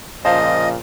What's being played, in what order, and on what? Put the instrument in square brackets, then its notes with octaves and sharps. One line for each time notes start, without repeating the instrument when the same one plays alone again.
[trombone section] A#2 C#3 F3 [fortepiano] C5 F5 A5 [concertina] D#5